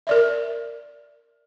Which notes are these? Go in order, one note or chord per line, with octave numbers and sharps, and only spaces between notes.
A#4 D5 E5